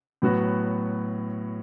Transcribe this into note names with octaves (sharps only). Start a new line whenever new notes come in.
A2 F#3 B3 F#4